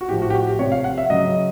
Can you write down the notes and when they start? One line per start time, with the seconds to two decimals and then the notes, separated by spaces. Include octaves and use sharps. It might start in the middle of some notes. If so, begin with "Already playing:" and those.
0.01 F#4
0.09 A2 F3 G4
0.22 F#4
0.30 G4
0.34 F#4
0.47 G4
0.59 C3 F3 C#5
0.72 F5
0.84 F#5
0.98 E5
1.10 C#3 F#3 D#5